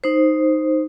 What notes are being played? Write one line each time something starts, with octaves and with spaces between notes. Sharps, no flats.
D#4 C5